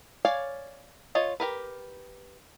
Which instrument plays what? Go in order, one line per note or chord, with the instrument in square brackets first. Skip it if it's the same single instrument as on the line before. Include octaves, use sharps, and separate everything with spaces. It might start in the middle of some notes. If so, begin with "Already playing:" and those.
[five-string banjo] C#5 D5 F5 G#5
F4 C#5 D#5
G4 A#4 B4